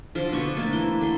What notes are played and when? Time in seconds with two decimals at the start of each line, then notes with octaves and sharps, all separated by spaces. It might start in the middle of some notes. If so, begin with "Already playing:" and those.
0.15 D3 F3
0.32 B2 D4 C#6
0.55 A3 A#3 A5
0.73 E3 E4 C6
1.01 D3 C6